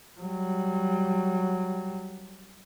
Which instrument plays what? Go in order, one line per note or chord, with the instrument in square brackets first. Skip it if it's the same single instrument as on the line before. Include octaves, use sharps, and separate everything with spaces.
[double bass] F#3 G3